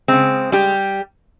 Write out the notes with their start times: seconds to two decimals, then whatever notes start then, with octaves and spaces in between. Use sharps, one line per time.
0.08 C#3 G#3 C4
0.52 G3 G4